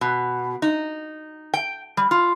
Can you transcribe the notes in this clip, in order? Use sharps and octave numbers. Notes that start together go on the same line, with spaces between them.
B2
D#4
G5
G3
F4